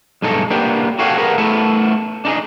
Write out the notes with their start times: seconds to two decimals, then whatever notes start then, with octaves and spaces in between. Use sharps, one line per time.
0.22 B1 G2 G#3 D#4 A4
0.50 A#3 B3 D4 G4
0.99 F#4 G4 A4 C#5 F5 F#5
1.18 G#4 A#4 B4 F#5
1.38 A3 B3 E4
2.25 D4 D#4 G#4